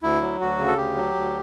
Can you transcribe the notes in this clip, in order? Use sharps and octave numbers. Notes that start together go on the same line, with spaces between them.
D2 E4
F#3
D2 F#4
C#3
A4
D2 G4
F#3
D2